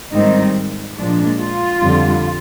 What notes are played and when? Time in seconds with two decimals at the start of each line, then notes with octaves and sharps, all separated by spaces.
0.13 G#2 D#3 G3 C4 D#4
0.98 A#2 F3 G#3 D4
1.40 F4
1.81 F2 D3 G3